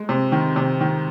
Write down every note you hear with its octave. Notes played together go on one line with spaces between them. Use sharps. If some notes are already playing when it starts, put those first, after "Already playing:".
Already playing: G#3
C3
D#3
C3
D#3